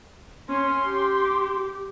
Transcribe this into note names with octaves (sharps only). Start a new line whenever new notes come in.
C#4 C6
G4